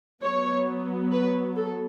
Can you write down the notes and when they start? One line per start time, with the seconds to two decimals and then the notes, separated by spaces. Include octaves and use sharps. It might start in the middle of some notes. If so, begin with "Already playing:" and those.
0.23 F#3 B3 C#5
1.12 B4
1.56 A4